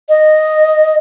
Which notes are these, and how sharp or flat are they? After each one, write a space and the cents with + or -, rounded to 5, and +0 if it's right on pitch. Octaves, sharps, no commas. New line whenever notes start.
D#5 -5